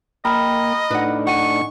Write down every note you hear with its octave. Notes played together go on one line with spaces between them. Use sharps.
A#3 D#5 G5 A#5 B5 F6
A2 D4 D#4 B4 F#5
F#5 G#5 C#6